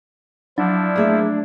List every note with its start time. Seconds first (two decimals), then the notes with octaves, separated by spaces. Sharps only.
0.58 F3 F#3 D4 E4
0.96 A3 A#3 G#4 E5